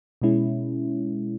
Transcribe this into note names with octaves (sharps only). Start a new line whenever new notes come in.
B2 G#3 C#4 E4